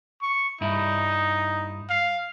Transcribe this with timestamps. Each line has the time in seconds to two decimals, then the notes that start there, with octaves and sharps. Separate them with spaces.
0.22 C#6
0.61 G2 D#4 E4
1.89 F5